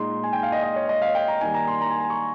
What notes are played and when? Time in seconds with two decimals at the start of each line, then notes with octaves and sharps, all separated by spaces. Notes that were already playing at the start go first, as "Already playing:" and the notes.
Already playing: A#2 G#3 D#4 C6
0.24 G#5
0.33 G5
0.43 F5
0.52 D#5
0.63 D#5
0.76 C#5
0.89 D#5
1.02 F5
1.15 G5
1.28 A#5
1.41 D#3 G3 A#3 D#4 G#5
1.54 A#5
1.68 C6
1.81 A#5
1.91 G#5
2.00 A#5
2.10 C#6